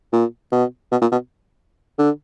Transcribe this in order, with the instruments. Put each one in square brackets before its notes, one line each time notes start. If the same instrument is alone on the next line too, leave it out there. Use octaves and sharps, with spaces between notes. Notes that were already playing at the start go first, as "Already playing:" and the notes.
[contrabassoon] A#2
B2
B2
A#2
B2
D3